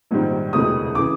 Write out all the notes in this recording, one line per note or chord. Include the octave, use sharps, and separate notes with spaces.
A#1 G#2 D#3 G3 C4
E1 D2 C3 E3 G#3 D#6
C#3 E3 D6